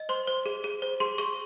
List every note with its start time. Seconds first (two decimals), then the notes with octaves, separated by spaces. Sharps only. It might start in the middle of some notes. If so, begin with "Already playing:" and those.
Already playing: D#5
0.09 C5 C6
0.27 C5
0.46 G#4
0.64 G#4
0.82 C5
1.00 G#4 C6
1.18 G#4 C#6